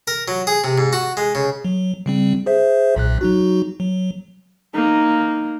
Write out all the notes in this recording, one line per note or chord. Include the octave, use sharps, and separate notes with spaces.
A#4
F#3
G#4
C3
G#2
F#4
G#3
C#3
F#3
C#3 G3 C4
G#4 C5 E5
B1 A#2 F#6
F#3 D#4 F#4
F#3
A#3 D#4